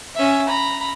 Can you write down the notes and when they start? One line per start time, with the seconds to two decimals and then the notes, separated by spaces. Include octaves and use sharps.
0.16 C#4 E5
0.49 A#5 B5